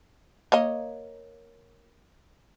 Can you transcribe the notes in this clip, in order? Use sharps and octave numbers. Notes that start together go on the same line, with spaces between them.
A#3 C#5 D#5